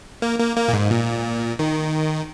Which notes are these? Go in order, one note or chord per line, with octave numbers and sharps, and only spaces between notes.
A#3
A#3
A#3
A#2
G#2
A#2
D#3